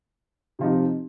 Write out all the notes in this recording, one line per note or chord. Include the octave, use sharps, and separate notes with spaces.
C3 F3 C4 D#4 G4